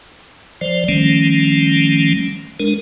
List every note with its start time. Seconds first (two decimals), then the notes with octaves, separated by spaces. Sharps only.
0.61 F3 C5 D5
0.89 D#3 F3 G3 A3 C#4
2.60 G#3 D4 A#4